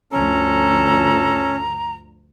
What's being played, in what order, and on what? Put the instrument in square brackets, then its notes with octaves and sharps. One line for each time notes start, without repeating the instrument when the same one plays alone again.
[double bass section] D2 G2 F3 [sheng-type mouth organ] C#4 [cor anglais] A4 [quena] A#5